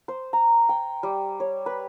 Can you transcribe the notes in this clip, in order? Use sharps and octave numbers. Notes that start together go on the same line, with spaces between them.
C5
A#5
G5
G3
C#5
B4